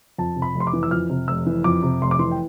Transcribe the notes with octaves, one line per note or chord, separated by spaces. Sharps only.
F2 A5
C3
B5
F1
C6
D6
E3
E6
F2 F6
C3
F1 E6
E3
F2 D6
C3
F1 C6
D6
E3 C6
G5